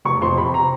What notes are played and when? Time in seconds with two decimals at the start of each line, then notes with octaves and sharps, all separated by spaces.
0.05 F1 C#6
0.22 F2 C6
0.37 C3 B5
0.54 A#5